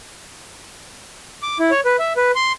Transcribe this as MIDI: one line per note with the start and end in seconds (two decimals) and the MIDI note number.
1.43 1.58 86
1.60 1.71 64
1.71 1.80 73
1.85 1.96 71
1.99 2.13 76
2.17 2.31 71
2.35 2.52 84